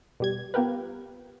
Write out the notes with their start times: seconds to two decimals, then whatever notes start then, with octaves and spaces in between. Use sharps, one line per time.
0.20 B2 G3 G#6
0.54 B3 F4 G4 A#4 B4